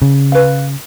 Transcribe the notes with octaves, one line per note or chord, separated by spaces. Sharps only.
C#3
B4 F5